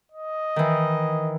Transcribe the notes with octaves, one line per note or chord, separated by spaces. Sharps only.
D#5
D#3 E3